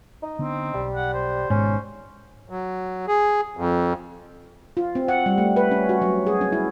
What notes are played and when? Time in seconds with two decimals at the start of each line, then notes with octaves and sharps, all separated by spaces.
0.23 D#4
0.39 D3 B3 C4 D4
0.74 B1 G3
0.95 F#5
1.14 C5
1.50 G#1 G#2 B2 C#4
2.50 F#3
3.08 G#4
3.57 F2
4.77 F4
4.95 C4
5.08 F#5
5.26 G3
5.38 A3
5.56 B4
5.71 C#4
5.89 F#4
6.02 F#3
6.27 G#4
6.41 C#4
6.53 E4